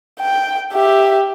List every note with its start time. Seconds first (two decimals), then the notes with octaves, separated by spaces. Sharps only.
0.21 G5
0.74 G4 E5